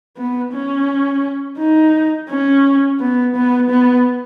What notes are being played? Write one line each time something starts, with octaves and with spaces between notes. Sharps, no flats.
B3
C#4
D#4
C#4
B3
B3
B3